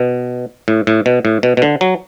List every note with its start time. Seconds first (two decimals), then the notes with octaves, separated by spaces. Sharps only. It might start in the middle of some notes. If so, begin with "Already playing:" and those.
Already playing: B2
0.68 A2
0.87 A2
1.06 B2
1.25 A2
1.43 B2
1.57 B2
1.62 D3
1.81 F#3